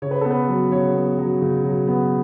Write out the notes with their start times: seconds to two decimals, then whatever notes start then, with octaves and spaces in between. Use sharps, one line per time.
0.02 C#3 C#5
0.11 B4
0.21 B3 A4
0.31 B4
0.48 F#3
0.71 C#3 C#5
0.94 B3
1.18 F#3
1.42 C#3
1.64 F#3
1.87 B3